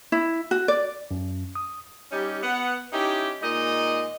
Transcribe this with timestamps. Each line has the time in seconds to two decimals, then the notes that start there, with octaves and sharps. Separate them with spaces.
0.12 E4
0.51 F#4
0.68 D5
1.11 F#2
1.55 D#6
2.12 G3 C#4 D#4 G4
2.43 B3 F#5
2.93 C#4 D#4 E4 G4
3.42 A#2 G#3 D#4 D5 D#5